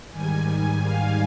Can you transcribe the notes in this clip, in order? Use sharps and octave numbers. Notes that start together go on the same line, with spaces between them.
G#2 D#3 G3 G#5
F5